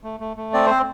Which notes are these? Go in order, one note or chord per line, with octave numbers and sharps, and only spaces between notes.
A3
A3
A3
C4 D5
C4 C5